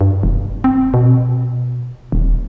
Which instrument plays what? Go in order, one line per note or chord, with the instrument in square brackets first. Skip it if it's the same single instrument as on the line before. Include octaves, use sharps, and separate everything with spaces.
[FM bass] G2
F1
C4
B2
D#1